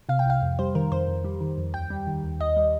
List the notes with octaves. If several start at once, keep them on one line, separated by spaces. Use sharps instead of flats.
C3 F5
G5
C2 F5
F2
G3 C5
D#3 A#4
F2 C5
F2
G3
D#3
F2
D#2 G5
G3
D#3
D#2
D#2 D#5
G3